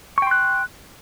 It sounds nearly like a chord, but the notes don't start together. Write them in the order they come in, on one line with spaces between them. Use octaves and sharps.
C#6 G5 C6 F#6